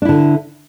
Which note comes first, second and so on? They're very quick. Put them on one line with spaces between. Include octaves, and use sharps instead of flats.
D4 E4 D3